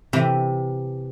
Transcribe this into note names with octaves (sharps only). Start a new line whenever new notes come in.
C3 E3